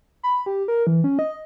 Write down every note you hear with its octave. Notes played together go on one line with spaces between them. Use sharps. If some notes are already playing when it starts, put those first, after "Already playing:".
B5
G4
A#4
E3
C#4
D#5